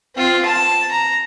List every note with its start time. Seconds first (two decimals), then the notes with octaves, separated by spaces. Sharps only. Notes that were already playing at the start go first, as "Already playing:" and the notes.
0.16 C4 F4
0.46 A5
0.91 A#5